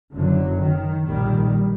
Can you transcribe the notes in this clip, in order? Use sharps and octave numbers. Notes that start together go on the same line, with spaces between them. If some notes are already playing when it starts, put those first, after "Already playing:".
F#1 F#2 D3 F#3
D#3
A#1 A#2 D#3 G3